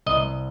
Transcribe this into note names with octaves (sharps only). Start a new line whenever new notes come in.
C2 D#5